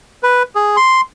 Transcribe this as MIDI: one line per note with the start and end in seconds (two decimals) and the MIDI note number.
0.23 0.43 71
0.55 0.77 68
0.77 1.01 84